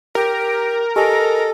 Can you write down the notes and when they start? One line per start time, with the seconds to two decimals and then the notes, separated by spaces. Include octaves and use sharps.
0.15 G4 A#4
0.96 G4 A4 D#5 G#5